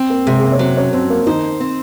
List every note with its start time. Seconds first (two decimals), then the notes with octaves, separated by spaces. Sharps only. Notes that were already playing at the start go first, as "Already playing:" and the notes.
Already playing: C4
0.09 A#3 A#4
0.26 C3 G#3 G#4
0.39 G#4
0.43 A#3 A#4
0.52 C#5
0.59 F#3 C4 C5
0.77 C#4 C#5
0.93 F2 C4 C5
1.10 A#3 A#4
1.26 D#3 D#4 C5
1.60 C4